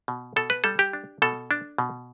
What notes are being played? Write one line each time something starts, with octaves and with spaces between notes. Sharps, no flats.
B2
B2 A4
B4
G3 A4
G4
D4
B2 A4
D4
B2